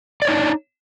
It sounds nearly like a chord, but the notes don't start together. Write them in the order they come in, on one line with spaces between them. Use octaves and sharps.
D5 C#5 D#4 D4